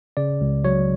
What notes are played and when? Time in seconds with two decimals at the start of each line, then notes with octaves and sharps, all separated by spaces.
0.17 C#3 D5
0.41 C#2
0.64 F#3 C#5